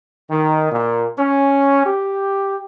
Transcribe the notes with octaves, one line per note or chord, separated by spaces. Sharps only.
D#3
A#2
C#4
G4